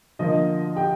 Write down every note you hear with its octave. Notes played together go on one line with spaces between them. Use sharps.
D3 F3 A#3 D#5
G4 G5